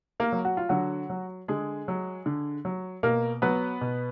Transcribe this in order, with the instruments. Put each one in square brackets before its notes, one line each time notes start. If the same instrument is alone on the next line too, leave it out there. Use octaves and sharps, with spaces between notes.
[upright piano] A#3 A#4
F#3
F#4
F4
D3 F#3 F#4
F#3
D3 G#3 G#4
F#3
D3
F#3
B2 A#3 A#4
F#3 B3 B4
B2